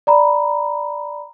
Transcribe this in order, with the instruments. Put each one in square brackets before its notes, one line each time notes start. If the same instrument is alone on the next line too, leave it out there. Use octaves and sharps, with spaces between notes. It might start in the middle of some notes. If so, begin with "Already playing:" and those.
[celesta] D5 A#5 B5